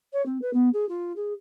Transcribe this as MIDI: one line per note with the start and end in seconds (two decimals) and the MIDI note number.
0.13 0.24 73
0.26 0.38 60
0.42 0.52 71
0.53 0.69 59
0.73 0.88 68
0.89 1.13 65
1.16 1.33 68